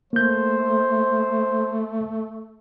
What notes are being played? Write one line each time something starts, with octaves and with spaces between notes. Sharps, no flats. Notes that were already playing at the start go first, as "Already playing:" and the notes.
A3 A#3 C5 G6